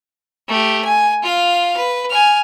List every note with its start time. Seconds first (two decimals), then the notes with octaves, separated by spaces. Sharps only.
0.48 A3 G4
0.85 G#5
1.22 F4 F5
1.77 B4
2.10 G#5 F6